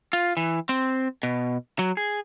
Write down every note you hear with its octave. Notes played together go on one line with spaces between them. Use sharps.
F4
E3
C4
B2
F#3
G#4